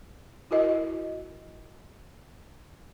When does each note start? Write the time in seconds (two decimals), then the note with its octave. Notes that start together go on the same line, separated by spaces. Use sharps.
0.51 E4 F#4 A#4 D#5